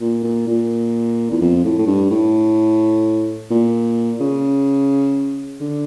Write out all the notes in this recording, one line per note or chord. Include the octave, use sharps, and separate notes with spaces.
A#2
A#2
A#2
E2
F2
A2
A2
G2
A2
A#2
C#3
D3